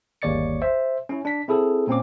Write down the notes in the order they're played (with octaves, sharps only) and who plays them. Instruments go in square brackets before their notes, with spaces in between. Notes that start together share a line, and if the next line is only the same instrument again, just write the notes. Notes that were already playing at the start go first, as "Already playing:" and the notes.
[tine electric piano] G1 D#2 C#5 D5 A6 C#7
C5 E5
C#4 E4
D4 B6
C4 E4 G#4 A4
A#2 C4 C#4 D6